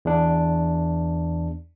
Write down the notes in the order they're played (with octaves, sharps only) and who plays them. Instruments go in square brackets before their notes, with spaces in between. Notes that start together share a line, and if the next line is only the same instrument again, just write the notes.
[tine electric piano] E2 D4